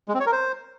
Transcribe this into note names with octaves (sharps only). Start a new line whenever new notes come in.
G#3
C4
C#5
A#4
C5